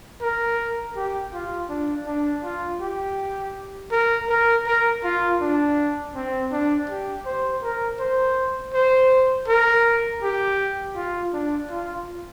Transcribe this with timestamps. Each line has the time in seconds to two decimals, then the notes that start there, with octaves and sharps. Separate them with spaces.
0.22 A#4
0.96 G4
1.33 F4
1.69 D4
2.07 D4
2.44 F4
2.81 G4
3.92 A#4
4.29 A#4
4.66 A#4
5.04 F4
5.41 D4
6.15 C4
6.52 D4
6.89 G4
7.26 C5
7.63 A#4
8.00 C5
8.74 C5
9.48 A#4
10.22 G4
10.96 F4
11.33 D4
11.70 F4